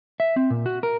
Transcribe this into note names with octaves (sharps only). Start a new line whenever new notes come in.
E5
C4
A#2
F#4
A#4